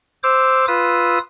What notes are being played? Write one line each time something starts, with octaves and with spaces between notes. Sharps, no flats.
C5 D6 E6 F6
F4 B4 D#6 E6